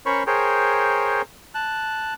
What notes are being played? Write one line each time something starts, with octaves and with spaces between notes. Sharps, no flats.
C#4 A#4 C5 C#5 B5 C#6
G#4 A#4 C5 C#5 G5
A5 F#6